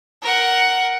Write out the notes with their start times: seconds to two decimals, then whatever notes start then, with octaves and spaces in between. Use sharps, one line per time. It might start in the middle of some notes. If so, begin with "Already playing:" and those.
0.22 A#4 F#5